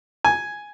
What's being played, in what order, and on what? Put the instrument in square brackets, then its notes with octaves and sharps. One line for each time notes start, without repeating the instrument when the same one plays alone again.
[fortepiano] G#5